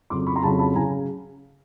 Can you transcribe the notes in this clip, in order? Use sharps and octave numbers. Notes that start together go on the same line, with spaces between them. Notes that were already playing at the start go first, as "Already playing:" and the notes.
F2 C#3 F#3 C6 D6
B5 C#6
A#5 C6
F2 C#3 F#3 A5 B5
A5 B5
C#3 F#3 G#5 A#5